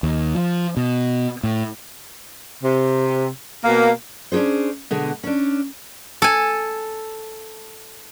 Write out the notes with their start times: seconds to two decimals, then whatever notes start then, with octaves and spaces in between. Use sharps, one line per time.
0.03 D#2
0.35 F3
0.77 B2
1.43 A2
2.62 C3
3.64 B2 A#3
4.32 C#4 D4 F#4 G#4 C5
4.91 B2 D3 G#3
5.24 C#4 D4
6.22 A4 G#5